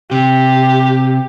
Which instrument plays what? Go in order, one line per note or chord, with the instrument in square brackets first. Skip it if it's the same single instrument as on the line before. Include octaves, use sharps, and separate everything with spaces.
[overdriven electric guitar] C3 [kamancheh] G4